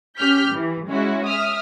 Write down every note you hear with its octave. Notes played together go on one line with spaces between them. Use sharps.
C#4 G4 F6 G6 B6
E3
G#3 C#4 E4 F#4
E5 D#6 F6